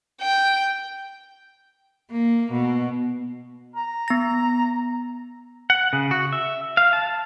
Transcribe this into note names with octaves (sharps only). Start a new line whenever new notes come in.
G5
A#3
B2
A#5
B3 A#6
F#5
C#3
F#4
E5
F5
A5